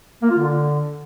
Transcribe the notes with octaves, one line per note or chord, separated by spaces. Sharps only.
A#3
F4
D3